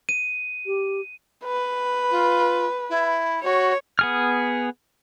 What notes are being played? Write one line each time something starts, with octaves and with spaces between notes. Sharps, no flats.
D#7
G4
B4
F4
E4
F#4 C#5
B3 G#4 F6